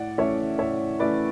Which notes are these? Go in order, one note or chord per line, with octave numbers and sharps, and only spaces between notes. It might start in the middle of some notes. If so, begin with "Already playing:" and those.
Already playing: A2 D5 F#5
E3 A3 C#4 C#5 E5
A2 C#5 E5
E3 A3 C#4 B4 D5